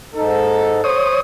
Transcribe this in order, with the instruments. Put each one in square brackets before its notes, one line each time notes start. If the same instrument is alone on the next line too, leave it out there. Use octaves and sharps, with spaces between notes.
[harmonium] G#2 D#4 [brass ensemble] A4
[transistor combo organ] C5 C#5 D#6